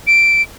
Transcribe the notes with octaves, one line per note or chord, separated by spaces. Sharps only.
D7